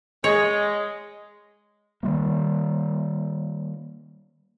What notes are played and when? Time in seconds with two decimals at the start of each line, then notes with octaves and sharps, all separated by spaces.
0.24 G#3 C#5
2.03 D#3 F#3 G3 A#3